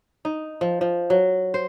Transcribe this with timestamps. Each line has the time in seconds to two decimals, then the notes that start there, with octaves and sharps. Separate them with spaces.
0.25 D#4
0.61 F3
0.81 F3
1.10 F#3
1.54 C5